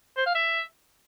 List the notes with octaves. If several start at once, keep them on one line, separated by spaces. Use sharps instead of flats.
C5
F5
E5